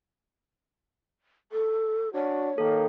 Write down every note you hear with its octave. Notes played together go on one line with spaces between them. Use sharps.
A4
D4 F#4 C#5
D#3 A#3 A4